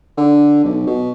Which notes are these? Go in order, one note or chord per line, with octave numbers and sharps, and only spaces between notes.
D3
B1
B2